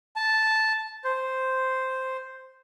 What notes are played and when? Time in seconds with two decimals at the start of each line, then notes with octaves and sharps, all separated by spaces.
0.16 A5
1.04 C5